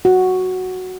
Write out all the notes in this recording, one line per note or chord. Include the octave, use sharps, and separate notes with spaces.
F#4